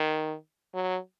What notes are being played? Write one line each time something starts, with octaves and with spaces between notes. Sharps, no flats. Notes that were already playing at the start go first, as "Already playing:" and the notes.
Already playing: D#3
F#3